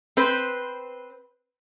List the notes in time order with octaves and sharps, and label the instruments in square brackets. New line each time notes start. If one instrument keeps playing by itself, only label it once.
[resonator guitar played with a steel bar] C4 B4 C5